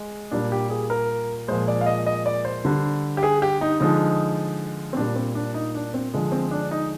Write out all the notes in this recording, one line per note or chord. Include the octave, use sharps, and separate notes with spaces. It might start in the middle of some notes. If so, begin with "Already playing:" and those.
Already playing: G#3
A#2 G3 D4
G4
G#4
A#4
A#2 F3 G#3 C5
D5
F5
D#5
D#5
D5
C5
D3 G3
G4
G#4
G4
D#4
D3 F3 G#3 D#4
C4
A#2 G3 D4
C4
D4
D#4
D4
C4
D3 F3 G#3
C4
D4
D#4